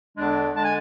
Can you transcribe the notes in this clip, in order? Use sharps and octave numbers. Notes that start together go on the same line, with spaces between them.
E2 D3 G#3 D4
D3 G#3 D4 A5
G#5